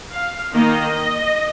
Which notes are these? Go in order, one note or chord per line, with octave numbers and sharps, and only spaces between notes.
F5
D#3 A#3 D#5